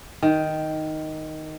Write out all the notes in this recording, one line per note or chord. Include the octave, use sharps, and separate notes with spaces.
D#3